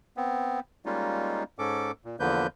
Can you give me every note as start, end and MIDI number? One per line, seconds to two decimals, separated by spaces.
0.17 0.60 59
0.17 0.60 60
0.86 1.43 55
0.86 1.43 56
0.86 1.43 58
0.86 1.43 61
0.86 1.43 63
0.86 1.43 65
1.59 1.92 44
1.59 1.92 61
1.59 1.92 69
1.59 1.92 86
2.05 2.16 46
2.20 2.47 40
2.20 2.47 50
2.20 2.47 53
2.20 2.47 58
2.20 2.47 71
2.20 2.47 91